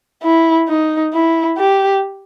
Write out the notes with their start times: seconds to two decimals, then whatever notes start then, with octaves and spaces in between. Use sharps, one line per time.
0.23 E4
0.69 D#4
1.14 E4
1.58 G4